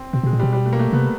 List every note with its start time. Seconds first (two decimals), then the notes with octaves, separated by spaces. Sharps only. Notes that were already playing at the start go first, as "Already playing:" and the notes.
Already playing: C4
0.13 B2 C4
0.23 B2 G#3
0.33 A#2
0.40 B2 G3
0.53 G3
0.66 A3
0.73 A#3
0.79 A3
0.93 C3 B3